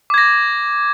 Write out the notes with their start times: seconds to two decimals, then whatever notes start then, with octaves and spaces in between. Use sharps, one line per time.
0.10 D6
0.14 G#6
0.18 A#6